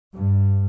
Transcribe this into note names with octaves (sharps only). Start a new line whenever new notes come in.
G2